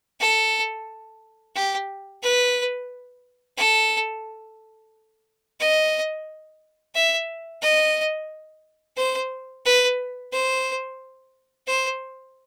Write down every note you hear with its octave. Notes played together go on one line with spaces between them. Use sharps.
A4
G4
B4
A4
D#5
E5
D#5
C5
B4
C5
C5